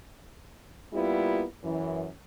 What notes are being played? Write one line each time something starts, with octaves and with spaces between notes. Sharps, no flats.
G3 A#3 B3 E4 F4
F#2 E3